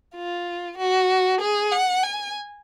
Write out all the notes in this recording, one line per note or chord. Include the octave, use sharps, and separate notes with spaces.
F4
F#4
G#4
F#5
G#5